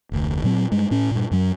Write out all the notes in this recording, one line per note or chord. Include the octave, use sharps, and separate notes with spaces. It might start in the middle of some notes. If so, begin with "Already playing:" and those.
F1 D2
A#2 F#3 C4
G2 G#3
A2 C#4
G2 A#2
F#2 F#3